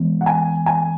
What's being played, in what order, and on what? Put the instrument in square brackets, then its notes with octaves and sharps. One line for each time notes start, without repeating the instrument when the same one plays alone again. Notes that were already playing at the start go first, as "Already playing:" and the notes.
Already playing: [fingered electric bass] E3 G#3 B3
[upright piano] F#5
G#5
G#5